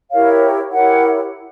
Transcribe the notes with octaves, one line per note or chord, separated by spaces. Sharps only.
E4 G4 A#4 C#5 F5
E4 G4 A#4 C#5 F#5